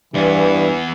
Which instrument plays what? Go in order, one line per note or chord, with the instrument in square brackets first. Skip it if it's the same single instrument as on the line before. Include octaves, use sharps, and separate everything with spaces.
[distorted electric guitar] E2 B3 [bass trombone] G2 [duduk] E3